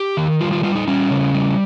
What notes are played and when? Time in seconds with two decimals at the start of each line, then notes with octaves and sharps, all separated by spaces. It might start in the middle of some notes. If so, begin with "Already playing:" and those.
Already playing: G4
0.17 D#3
0.40 G3 F4
0.52 F4
0.63 G3 F4
0.75 D#4
0.87 G3 C#4
1.10 C#3
1.35 G3